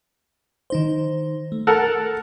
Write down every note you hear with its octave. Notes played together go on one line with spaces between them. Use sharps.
D#3 D#4 C5
A3
A4 A#4 F#5